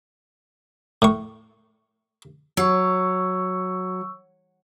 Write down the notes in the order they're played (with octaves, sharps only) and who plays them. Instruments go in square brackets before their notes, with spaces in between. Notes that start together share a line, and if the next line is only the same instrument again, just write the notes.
[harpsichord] A2 C#6
[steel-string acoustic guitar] F#3 [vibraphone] C#6 E6